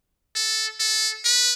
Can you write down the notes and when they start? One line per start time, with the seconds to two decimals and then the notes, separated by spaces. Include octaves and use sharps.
0.36 A4
0.80 A4
1.25 B4